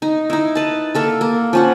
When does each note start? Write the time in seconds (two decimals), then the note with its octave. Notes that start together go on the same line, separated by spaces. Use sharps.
0.02 D#4
0.30 D#4 E4
0.55 B4 A5
0.95 A#3 A4 E5
1.21 A#3
1.53 F3 C#4 F#5